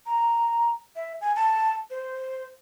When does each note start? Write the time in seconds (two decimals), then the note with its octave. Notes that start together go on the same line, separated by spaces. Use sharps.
0.06 A#5
0.96 E5
1.21 G#5
1.36 A5
1.90 C5